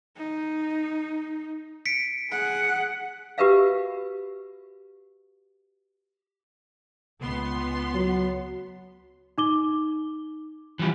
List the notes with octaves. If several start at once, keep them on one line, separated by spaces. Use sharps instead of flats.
D#4
B6 C#7 D7
G#4 F#5
F#4 G4 A#4 B4 E5 F5
C#2 B3 C6
F#3
D#4 D6 G7
E3 F3 G3